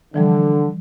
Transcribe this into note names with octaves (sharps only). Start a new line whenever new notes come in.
D3 E3 F3 G3